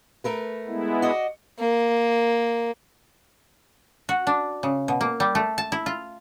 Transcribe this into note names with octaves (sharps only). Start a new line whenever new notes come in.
A3 A#4 B4
G#3 B3 E4
F#4 D5 D#5
A#3
F#4
D4
C#3
B2
A#3
G3
A3
A5
E4
F4